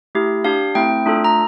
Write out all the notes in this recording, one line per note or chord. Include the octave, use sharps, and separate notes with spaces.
A3 E4 G4
D4 G4 F5
A3 C4 E4 G5
A3 D4 F4 A4
A#5